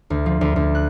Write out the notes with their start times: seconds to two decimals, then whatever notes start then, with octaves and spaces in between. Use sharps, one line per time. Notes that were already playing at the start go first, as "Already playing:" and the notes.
0.10 D2
0.26 F3
0.41 D2
0.56 D2
0.75 F#6